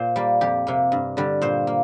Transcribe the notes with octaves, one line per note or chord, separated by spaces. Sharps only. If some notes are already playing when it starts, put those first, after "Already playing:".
Already playing: A#2 C5
G3 A#3
F2 G4
C3 A#3
G2
D3 G3
A#2 C5
A#3